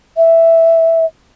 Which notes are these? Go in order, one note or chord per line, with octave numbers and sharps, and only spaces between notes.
E5